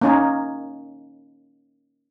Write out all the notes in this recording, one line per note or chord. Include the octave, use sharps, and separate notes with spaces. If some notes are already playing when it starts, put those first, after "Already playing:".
A#3 C#4 D#4